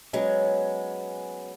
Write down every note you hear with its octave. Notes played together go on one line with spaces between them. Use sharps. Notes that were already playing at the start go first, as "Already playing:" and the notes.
F#3 G#3 B3 C#4